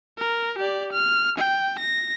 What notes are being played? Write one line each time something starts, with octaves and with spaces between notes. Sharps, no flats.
A#4
G4 D5
F6
G5
A#6